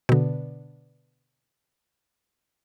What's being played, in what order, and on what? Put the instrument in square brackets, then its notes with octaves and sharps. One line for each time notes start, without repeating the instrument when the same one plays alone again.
[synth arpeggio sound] B2 D3